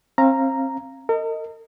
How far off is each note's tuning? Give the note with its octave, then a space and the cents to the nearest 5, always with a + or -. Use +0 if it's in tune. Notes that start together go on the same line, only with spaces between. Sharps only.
C4 +35 F5 -15 A#5 +0
A#4 -40 D#5 +10